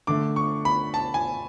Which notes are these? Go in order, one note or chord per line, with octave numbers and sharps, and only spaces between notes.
D3 A3 D6
C#6
B5
A5
G#5